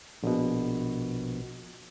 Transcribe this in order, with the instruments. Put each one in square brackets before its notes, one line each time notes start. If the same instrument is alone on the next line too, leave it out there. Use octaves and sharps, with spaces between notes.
[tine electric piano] A#1 B2